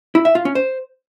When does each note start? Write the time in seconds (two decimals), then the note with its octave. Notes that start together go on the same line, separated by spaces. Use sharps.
0.15 E4
0.25 E5
0.35 F4
0.45 C#4
0.55 C5